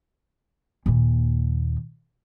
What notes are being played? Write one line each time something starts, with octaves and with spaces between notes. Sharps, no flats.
D#2 A#2